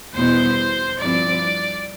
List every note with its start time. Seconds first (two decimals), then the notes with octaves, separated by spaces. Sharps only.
0.15 E2 B2 G3 B3 E4 C5
0.99 G2 F3 C4 E4 D5